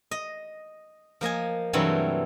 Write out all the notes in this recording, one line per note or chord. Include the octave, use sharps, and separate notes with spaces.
D#5
F3 A#3 D#5 G#5
G2 C3 E3 F#3 G3 A3